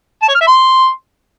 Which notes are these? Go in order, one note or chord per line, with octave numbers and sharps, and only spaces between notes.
A5
C#5
F6
E5
C6